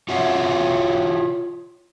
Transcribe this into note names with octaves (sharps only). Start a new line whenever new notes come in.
F4 F#4 C#5 E5 F#5